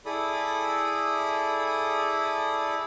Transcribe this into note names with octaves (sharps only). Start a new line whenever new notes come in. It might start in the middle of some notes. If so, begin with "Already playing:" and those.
E4 G#4 A4 D5 B5 D#6